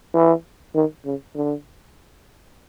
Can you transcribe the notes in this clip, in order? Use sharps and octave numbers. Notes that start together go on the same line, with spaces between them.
E3
D#3
C#3
D3